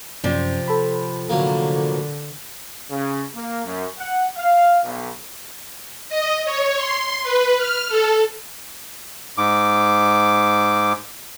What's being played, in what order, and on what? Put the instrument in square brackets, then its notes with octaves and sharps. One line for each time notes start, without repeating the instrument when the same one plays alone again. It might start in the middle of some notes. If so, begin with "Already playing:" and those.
[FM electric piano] F#2 C#4 D5 [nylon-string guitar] C3 F3
[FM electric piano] A4 B5
[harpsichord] A2 F#3 A#3 [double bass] D3
[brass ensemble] C#3
A#3
F#2
F#5
F5
B1
[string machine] D#5
C#5
C6
B4
F6
A4
[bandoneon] G#2 D6